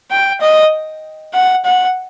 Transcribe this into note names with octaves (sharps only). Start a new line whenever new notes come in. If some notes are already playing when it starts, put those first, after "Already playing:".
G5
D#5
F#5
F#5